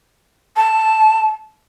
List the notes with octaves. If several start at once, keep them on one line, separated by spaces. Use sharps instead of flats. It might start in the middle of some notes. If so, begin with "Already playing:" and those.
A5